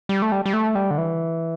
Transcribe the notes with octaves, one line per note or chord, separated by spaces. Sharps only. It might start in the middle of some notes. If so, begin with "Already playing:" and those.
G3
A3
G3
G3
A3
G3
D3
E3